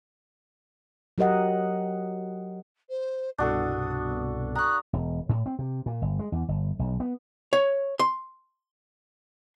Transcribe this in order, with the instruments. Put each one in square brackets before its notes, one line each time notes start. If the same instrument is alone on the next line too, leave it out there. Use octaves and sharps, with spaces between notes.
[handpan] F#3 G4 A#4 D#5 F#5
[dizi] C5
[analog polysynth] C2 G2 B2 [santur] D4 F#4 A4 [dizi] D#6
[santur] A#5 [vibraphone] C#6 D#6 [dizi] F#6
[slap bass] E1
A2
C4
C3
A#2
G1
G#3
E2
G1
B1
B3
[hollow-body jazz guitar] C#5
C6